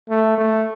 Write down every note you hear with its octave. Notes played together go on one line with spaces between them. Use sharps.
A3
A3